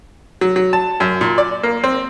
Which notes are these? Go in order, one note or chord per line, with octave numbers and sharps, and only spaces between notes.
F#3
F#3
A5
F#2
A#2
D5
A#3
C4